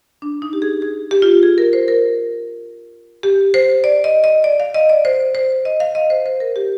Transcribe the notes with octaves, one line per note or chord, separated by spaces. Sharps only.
D4
D#4
G4
G#4
G#4
G4
F4
G#4
A#4
C5
A#4
G4
C5
D5
D#5
D#5
D5
F5
D#5
D5
C5
C5
D#5
F5
D#5
C5
C5
A#4
G4